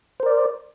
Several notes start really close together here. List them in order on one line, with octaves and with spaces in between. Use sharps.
C5 A#4 D5